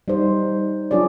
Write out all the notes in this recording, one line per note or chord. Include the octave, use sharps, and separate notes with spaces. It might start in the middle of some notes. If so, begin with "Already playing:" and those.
G3 D#4 C5
F#3 D4 F4 G#4 C#5 D5